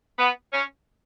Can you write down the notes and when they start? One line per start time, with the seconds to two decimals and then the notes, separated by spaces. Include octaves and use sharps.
0.19 B3
0.53 C#4